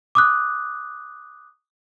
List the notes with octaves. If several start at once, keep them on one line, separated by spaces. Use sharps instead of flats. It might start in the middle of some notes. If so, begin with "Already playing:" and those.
D6 D#6 F#6